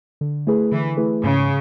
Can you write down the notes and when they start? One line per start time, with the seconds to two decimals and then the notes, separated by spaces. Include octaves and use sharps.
0.21 D3
0.47 A3 E4 G#4 B4
0.72 D3 E3
0.97 A3 E4 G#4 B4
1.23 G#2 C#3